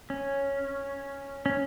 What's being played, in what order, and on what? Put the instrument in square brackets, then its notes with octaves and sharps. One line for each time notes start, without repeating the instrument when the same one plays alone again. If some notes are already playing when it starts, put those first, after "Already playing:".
[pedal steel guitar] C#4
C#4